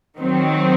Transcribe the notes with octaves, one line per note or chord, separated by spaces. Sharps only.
D#3 F#3 C4